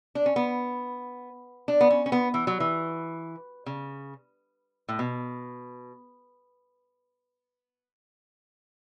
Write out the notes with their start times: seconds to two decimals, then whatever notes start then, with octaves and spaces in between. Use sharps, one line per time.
0.15 D4
0.26 C#4
0.36 B3
1.68 D4
1.81 B3
1.90 C#4
2.06 C#4
2.12 B3
2.34 E3
2.47 F#3
2.60 E3
3.66 C#3
4.89 A2
4.99 B2